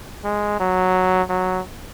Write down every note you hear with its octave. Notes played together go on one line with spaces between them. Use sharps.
G#3
F#3
F#3